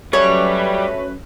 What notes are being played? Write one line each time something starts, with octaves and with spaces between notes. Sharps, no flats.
F#3 G3 A3 C#4 F#4 B4 C#5